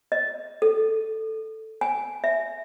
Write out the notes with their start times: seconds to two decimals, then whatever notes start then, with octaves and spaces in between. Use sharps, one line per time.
0.12 D#5
0.62 A4
1.81 G#5
2.24 E5